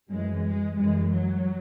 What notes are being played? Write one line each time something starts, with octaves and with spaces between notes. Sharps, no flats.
F#2 E3 G#3
G#3
F#2 E3 G#3
F#3